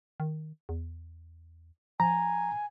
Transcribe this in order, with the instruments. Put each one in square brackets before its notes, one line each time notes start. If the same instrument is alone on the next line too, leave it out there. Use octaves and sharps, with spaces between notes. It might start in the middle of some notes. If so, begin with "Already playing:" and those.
[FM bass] D#3
E2
[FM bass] F3 [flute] G#5 [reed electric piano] A#5